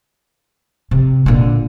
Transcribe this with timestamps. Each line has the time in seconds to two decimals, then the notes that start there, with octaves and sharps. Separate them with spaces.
0.91 C3
1.26 A#2 D3